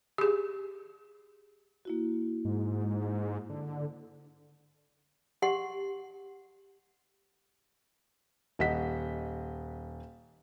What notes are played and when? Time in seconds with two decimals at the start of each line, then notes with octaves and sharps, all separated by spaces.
0.18 G4 G#4
1.85 A#3 E4 F#4
2.45 G#2
3.50 D3
5.42 G4 F#5 C6
8.59 D#1 D#5 F#5 B6